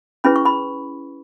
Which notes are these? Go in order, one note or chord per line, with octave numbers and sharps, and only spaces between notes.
C#4 E4 G#4 B4 B5
C#6
B5